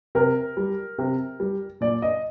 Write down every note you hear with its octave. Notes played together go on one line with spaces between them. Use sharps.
C3 A#4
G3
C3
G3
A#2 D5
D#5